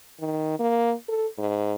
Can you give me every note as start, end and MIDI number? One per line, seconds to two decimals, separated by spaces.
0.20 0.58 51
0.59 0.93 58
1.09 1.26 69
1.38 1.74 44